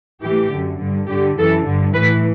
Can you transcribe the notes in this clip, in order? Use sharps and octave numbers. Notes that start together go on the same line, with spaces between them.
A2 E3 G4
F#2 D3
G2 D3
G2 D3 G4
F#2 E3 A4
G2 D3
A2 E3 B4